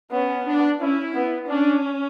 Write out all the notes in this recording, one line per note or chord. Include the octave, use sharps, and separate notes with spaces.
B3 C#4
D4
C#4 E4
B3
C#4 D4